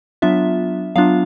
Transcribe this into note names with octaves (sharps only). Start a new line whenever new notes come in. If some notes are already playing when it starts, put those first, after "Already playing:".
F#3 B3 D4 F4 E5
F#3 B3 D4 F4 F5